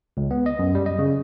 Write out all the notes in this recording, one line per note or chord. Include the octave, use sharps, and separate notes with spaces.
C#2
B3
D#5
F#2
G3
D#5
C#3